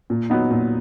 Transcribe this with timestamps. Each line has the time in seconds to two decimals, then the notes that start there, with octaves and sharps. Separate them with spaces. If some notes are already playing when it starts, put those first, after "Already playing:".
0.10 A#2
0.30 F#3 B3 D#4
0.50 A#2